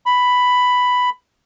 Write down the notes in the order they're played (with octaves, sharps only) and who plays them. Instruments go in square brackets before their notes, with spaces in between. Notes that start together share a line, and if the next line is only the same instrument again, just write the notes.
[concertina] B5